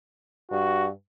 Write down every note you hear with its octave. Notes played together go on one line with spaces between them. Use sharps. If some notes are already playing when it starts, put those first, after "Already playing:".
G2 F#4